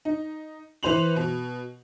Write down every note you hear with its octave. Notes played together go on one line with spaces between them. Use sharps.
D#4
E3 B4 C5 F7 F#7
B2